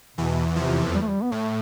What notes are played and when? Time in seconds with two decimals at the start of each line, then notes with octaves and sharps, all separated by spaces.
0.18 E2 B2 E3
0.56 F2 C3 F3
0.94 G3
1.01 A3
1.10 G3
1.23 B3
1.32 A2 A3